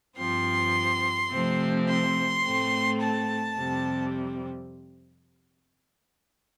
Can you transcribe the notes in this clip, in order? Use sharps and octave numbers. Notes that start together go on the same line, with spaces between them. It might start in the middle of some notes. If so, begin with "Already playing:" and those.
G2 F3 C4 C6
C3 F3 A3 C4
C6
A2 A3 C4
A5
F2 C3 G3 C4